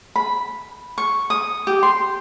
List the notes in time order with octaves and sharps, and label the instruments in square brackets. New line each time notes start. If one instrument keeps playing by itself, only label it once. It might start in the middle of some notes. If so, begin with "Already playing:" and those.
[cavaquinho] B5
C#6
D#6
G4
C6